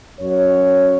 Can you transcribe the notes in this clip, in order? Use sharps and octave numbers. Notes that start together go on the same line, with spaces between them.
F#2 F#3 C#5